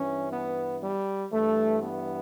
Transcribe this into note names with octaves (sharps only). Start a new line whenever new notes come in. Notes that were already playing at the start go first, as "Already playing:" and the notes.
Already playing: G2 E3 C#4
B3
G3
G2 E3 A3
B3